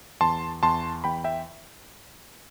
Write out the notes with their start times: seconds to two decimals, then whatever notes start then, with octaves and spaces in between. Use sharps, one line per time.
0.21 E2 A5 C6
0.63 E2 A5 C6
1.04 E2 G5 B5
1.24 E5 G5